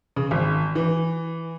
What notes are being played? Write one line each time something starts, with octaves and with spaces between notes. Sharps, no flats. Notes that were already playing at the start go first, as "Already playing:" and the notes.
C#3
G#1
E3